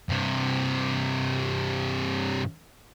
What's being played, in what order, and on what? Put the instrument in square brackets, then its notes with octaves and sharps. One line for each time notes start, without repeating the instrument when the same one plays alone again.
[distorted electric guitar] G2 C3